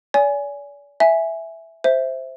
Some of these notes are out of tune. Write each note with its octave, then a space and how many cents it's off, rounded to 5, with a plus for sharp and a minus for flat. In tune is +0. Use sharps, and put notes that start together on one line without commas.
D5 -40 G#5 +0
E5 +0 G#5 +0
C5 +0 E5 +0